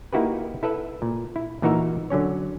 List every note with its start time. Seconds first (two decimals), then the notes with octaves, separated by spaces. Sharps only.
0.13 A#3 D#4 E4 F#4 G4 B4
0.63 E4 A4 B4 E5
1.02 A#2
1.36 E4
1.62 A#2 E3 D#4 F#4 A#4 E5
2.10 D3 F#3 C#4 C#5